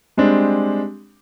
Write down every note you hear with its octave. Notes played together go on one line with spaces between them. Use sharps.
G3 G#3 C4 D4 G4